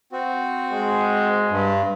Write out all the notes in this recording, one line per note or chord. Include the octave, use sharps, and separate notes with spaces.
C4 F#4
G#3
G2